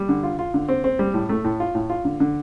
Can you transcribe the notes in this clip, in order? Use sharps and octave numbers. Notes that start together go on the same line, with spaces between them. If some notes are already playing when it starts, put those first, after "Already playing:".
Already playing: G3
D3
F4
F4
D3
C4
C4
G3
A2
A3
A2
F4
A2
F4
D3
D3